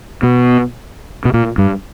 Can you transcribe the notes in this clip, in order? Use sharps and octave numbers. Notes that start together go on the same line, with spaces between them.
B2
B2
A#2
G2